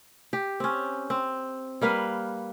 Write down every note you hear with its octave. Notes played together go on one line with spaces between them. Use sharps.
G4
C4 C#4
C4
G3 A#3 B4 F5